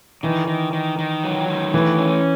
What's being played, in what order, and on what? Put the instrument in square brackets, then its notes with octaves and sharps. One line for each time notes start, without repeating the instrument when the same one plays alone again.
[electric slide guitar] D#3 [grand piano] E3
[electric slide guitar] D#3
D#3
D#3
F#3
D#3
[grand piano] E3 [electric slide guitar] A3
[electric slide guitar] C#4